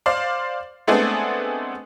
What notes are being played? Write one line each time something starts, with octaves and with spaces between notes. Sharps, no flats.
C5 D5 F5
G#3 A3 B3 C4 D4 G#4